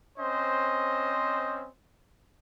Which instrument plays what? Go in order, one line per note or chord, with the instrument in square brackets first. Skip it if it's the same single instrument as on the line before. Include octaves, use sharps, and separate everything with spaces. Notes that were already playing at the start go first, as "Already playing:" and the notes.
[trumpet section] C4 C#4 C5 D#5